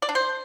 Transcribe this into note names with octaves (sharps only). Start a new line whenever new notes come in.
D5
D4
C5